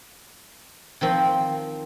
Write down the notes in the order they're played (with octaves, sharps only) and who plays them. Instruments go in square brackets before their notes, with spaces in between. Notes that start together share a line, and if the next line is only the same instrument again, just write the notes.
[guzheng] D#3 F3 C4